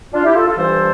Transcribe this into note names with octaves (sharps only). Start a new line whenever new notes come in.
D4 F4
E4 G4
F4 A4
F4 A4
G2 E3 G3 A4 C5